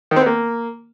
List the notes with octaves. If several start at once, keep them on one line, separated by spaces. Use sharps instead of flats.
D#3
C4
B3
A#3